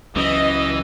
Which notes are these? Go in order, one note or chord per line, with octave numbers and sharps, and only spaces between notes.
C#2 E3 F#3 C#4 D#5